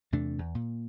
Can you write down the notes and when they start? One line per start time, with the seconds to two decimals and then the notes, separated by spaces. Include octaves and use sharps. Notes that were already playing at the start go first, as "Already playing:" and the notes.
0.12 E2 C3 A3 D4
0.39 E2
0.55 A#2